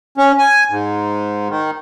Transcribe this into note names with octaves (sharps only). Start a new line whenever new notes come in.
C#4
G#5
G#2
D#3